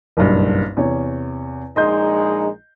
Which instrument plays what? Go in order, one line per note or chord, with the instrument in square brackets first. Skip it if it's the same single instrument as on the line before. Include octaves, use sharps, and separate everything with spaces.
[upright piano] F#1 B1 G2
E2 C3 C#5
[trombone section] A#1 G#3 D#4 [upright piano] D#5 C6 G6